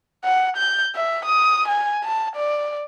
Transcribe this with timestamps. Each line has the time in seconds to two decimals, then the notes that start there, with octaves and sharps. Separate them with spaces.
0.24 F#5
0.57 G6
0.95 E5
1.25 D#6
1.68 G#5
2.04 A5
2.36 D5